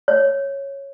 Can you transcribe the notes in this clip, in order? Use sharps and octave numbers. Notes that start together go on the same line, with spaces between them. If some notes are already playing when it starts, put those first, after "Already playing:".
C#5